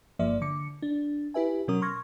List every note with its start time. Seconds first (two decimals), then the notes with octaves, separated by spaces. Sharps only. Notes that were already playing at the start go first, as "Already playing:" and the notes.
0.19 G1 G2 F3 A#3 D5 E5
0.41 D3 D6 C#7
0.82 D4
1.34 E4 G4 B4 E5 G#5
1.68 B2 F#3 C#4 A#4 D#6
1.82 C6 C#6 F6 G#6 A#6